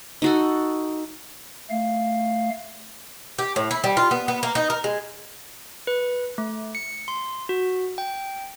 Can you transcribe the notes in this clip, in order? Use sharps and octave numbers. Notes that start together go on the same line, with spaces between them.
D#4 F#4 A4
A3 F5
G4
A2
E4
G3
F4
B3
B3
A#3
D#4
A#4
G#3
B4
A3
C#7
C6
F#4
G5